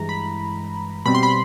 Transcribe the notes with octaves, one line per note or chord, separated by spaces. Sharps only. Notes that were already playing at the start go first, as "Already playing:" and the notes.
Already playing: G2 E3 G#3 A#5
B5
B2 G3 C4 B5
C6
B5